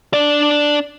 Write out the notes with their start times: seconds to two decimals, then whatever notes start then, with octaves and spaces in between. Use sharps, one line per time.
0.14 D4 D5